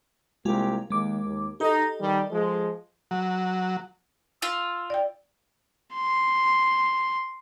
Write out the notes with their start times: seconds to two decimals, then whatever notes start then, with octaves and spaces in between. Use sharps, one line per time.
0.45 C2 G#3 A#3 F4 G4 G#5
0.90 D#2 G#3 D6
1.24 D#2
1.60 D#4 G4 A4 D#5
2.00 D#3 G3
2.31 F3 G#3
3.11 F#3
4.42 F4 E6
4.90 D5 G5
5.95 C6